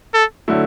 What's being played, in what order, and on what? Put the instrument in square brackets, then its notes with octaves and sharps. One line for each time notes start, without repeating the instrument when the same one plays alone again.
[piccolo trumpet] A4
[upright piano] D3 F#3 A3 E4